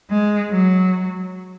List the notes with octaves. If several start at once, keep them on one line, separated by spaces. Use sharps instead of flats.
G#3
F#3